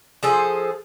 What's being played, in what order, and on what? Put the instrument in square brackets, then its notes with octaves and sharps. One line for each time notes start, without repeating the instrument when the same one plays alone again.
[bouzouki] F3 G#4 A4 C5